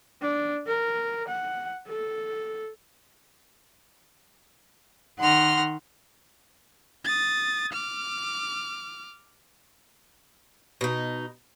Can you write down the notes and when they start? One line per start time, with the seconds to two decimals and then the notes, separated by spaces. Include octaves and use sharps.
0.21 D4
0.67 A#4
1.28 F#5
1.88 A4
5.18 D#3 F#5 C6 F6 A#6
7.05 D#6 A6
7.73 D6 F6
10.81 B2 D#4